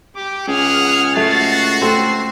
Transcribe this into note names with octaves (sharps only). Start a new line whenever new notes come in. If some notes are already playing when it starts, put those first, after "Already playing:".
G4 D6
C#2 G#4 F#5 F6
A3 F#4 A6 C7
A3 C4 A4 C7